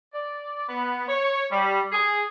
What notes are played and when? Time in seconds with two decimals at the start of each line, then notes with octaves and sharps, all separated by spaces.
0.13 D5
0.68 B3
1.07 C#5
1.50 G3
1.92 G#4